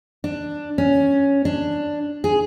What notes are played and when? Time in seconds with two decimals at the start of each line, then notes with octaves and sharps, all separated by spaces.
0.24 D4
0.78 C#4
1.45 D4
2.24 G#4